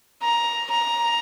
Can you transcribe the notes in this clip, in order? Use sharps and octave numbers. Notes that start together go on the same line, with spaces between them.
A#5
A#5